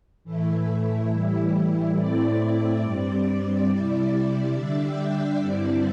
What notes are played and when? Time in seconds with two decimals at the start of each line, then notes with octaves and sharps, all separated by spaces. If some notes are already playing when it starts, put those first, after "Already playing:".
0.24 A2 E3 A3 E4
1.11 A2 E3 G3 E4
1.96 A2 A3 C4 E4 D5
2.82 G2 G3 C4
3.68 C3 G3 E4
4.54 D3 G3 D4 E5
4.83 G5
5.12 E5
5.39 G2 D3 G3 C4 E4 D5